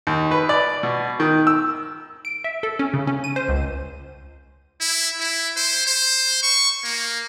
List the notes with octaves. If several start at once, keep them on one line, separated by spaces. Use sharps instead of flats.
D#2
B4
D5
B2
D#3
E6
D7
E5
A4
C#4
C#3
C#4
D#7
C5
C#2
E4
E4
C5
C5
C#6
A#3